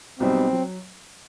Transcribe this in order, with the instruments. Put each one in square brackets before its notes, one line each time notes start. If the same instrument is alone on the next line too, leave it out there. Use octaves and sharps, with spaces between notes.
[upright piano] B1 B2 G3 D#4 [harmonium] C4
[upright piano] F#3